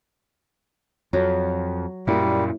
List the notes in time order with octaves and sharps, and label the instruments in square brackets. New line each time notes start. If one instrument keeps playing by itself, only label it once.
[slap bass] F2 [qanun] F#3
[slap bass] F#2 A#2 [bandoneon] G3 [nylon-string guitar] A#3 E4